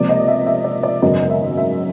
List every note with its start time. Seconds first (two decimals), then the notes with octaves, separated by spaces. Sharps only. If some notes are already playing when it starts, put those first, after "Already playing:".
Already playing: C#2 C3 F3 A#3 D5
0.09 D#5
0.28 E5
0.46 E5
0.64 D5
0.83 D5
1.02 G#1 F#2 C#3 F#3 B3 D#5
1.30 E5
1.58 E5